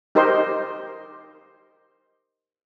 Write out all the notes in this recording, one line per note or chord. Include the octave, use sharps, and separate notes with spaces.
D#4 G4 A#4 C5 D#5 C6